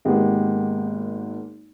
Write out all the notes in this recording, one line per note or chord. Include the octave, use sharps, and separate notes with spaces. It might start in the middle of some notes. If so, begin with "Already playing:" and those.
G#1 G#3 A#3 B3 G4